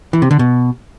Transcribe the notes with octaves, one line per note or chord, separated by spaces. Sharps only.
E3
C3
D3
B2